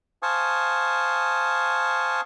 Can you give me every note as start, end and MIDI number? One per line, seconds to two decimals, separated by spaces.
0.23 2.21 72
0.23 2.21 77
0.23 2.21 80
0.23 2.21 81
0.23 2.21 85
0.23 2.21 87